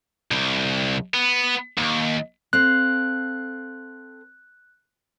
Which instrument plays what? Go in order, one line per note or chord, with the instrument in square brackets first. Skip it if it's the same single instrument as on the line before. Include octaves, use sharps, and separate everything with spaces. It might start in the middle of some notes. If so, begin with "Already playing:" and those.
[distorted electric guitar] C2
B3
D#2
[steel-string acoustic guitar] C4 A4 F5 [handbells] F#6